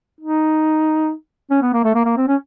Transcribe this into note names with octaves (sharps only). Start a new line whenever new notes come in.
D#4
C#4
B3
A#3
A3
A#3
A#3
C4
C#4